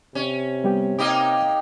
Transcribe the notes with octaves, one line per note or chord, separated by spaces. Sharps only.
C3 C#4
G3 B3 G4
A#3 D#4 G4 D6 D#6 F6